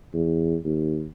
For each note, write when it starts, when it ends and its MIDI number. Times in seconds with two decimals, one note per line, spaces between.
0.13 0.56 40
0.64 1.08 39